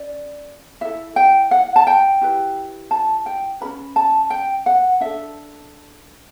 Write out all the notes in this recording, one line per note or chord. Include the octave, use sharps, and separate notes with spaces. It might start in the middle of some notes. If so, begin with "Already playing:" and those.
Already playing: C#4 D5
E4 A4 E5
G5
F#5
A5
G5
E4 G4 B4
A5
G5
C#4 F#4 B4 B5
A5
G5
F#5
D4 A4 E5